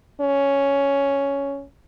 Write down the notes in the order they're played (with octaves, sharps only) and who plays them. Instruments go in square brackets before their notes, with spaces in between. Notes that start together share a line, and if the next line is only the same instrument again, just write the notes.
[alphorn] C#4